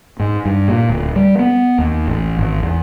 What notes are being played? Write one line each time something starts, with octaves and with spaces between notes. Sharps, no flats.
G#2
G2
A#2
D1
G3
B3
D#2
A1
G#1
E2